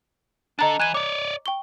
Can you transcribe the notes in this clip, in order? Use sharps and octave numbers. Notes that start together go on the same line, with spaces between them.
D4 A4 D#5 A#5 A6
E3 F#6 G#6 D#7
C#5 D5 D6
G5 C#6 G7